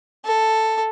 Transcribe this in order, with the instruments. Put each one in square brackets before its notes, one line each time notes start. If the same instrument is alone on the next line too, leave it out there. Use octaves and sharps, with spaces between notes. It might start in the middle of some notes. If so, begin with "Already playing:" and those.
[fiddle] A4